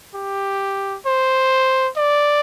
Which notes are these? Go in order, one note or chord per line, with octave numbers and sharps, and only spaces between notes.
G4
C5
D5